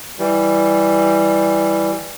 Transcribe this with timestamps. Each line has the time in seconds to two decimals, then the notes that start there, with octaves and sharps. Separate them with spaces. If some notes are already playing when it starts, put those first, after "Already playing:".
0.19 E3 G3